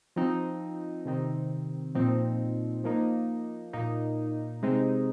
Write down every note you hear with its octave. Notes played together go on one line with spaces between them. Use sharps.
F3 C4 D#4
C3 D#3 C4 D#4
A#2 F3 C4 D#4
F3 A#3 D#4
A#2 A#3 D#4
C3 G#3 C4 D#4